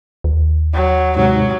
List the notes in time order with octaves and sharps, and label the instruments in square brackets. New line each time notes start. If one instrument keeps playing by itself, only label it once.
[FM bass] D#2
[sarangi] F#3
[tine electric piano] G#2 C3 [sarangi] F#3